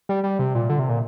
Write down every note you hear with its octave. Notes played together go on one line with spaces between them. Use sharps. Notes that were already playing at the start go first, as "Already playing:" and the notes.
G3
G3
C3
A#2
D3
C3
A#2